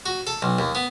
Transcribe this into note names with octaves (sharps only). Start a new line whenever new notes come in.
F#4
A4
B1
D#2
B3